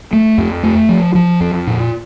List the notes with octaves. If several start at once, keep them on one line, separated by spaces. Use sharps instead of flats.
A3
F2
A3
F3
F3
F2
A#2